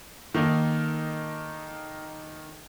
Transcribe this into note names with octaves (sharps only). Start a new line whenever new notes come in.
D#3 A#3 D#4 A4